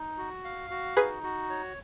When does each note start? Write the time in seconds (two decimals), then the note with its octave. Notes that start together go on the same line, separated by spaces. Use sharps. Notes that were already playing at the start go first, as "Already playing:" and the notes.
Already playing: D#4
0.17 F#4
0.44 F5
0.70 F#4
0.97 D#4 G#4 B4
1.23 F#4
1.50 C#5